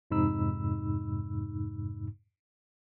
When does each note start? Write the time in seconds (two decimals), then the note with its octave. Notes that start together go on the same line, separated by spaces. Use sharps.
0.11 F2 G#2 C3 D#4 B5 E6